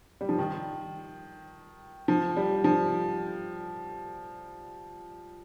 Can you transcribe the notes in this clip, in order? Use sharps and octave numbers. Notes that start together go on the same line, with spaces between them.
G3
F3
D#3
F3
G3
F3